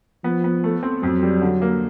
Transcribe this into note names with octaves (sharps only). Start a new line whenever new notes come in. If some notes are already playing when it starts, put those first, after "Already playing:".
F3 B3
B3
A3
C4
F2 F#3
G3
D3
A#3